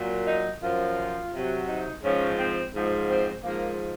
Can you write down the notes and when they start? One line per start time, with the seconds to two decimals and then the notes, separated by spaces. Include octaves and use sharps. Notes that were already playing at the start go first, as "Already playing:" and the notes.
Already playing: A#2 F#3
0.26 D#4
0.61 F#2 F3 F4
1.32 C3 F#3
1.68 D#4
2.02 G#2 F3 C#4
2.38 C4
2.73 G#2 F3
3.08 C4
3.44 G#2 F3 A#3